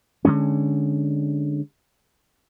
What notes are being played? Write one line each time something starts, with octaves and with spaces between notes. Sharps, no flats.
D3 F3 G#3 C#4